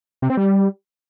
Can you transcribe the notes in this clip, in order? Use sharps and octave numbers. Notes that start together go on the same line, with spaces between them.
C3
C4
G3